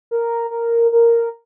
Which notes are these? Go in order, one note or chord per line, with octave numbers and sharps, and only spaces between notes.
A#4
A#4
A#4